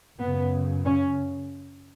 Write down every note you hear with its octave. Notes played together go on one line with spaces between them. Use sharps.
F#2 C#3 B3
C#4